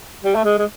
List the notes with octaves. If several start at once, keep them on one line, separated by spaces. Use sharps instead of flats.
G3
A3
G#3
G#3